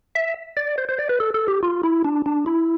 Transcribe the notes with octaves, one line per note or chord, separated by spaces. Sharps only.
E5
D5
C5
C5
D5
B4
A4
A4
G4
F4
E4
D4
D4
E4